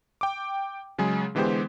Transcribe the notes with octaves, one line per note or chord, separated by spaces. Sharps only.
G5 D6
C#3 F#3 G#3 G#4
D3 E3 G#3 B3 G4 C5